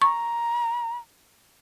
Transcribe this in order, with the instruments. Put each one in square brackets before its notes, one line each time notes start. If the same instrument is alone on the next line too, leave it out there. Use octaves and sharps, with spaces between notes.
[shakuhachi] A#5 [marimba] C#6